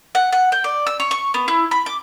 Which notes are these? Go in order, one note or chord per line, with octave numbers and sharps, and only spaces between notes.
F#5
F#5
G5
D5
E6
C#5
C#6
B3
E4
B5
D6